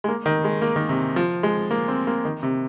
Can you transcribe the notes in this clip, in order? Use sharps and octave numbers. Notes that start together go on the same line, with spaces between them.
G#3
A#3
D#3
G#3
A#3
D#3
C3
F3
G#3
A#3
C4
A#3
D#3
C3